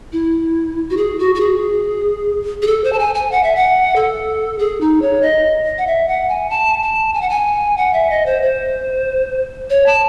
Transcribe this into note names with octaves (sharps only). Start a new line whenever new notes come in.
E4
F#4
G#4
F#4
F#4
G#4
G#4
A4
C5
A5
G#5
G#5
F#5
E5
F#5
A4
G#4
D#4
C#5
D#5
F#5
E5
F#5
G#5
A5
A5
G#5
F#5
G#5
F#5
E5
D#5
C5
C5
C#5
A5